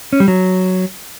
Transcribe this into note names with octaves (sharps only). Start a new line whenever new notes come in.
C#4
G3
F#3